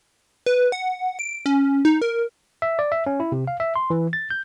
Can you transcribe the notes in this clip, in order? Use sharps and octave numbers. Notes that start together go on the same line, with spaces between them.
B4
F#5
D7
C#4
D#4
A#4
E5
D5
E5
C#4
E4
C3
F5
E5
C6
E3
A6
G6